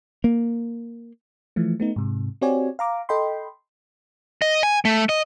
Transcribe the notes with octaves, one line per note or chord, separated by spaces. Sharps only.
A#3
E3 F3 A3
A3 B3 D#4
G#2 C3
C4 F#4 G4 C#5 D5 G#5
F5 A#5 D6
A4 D#5 G5 B5 C6
D#5
G#5
A3
D#5